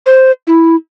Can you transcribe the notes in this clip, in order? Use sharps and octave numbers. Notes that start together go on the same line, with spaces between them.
C5
E4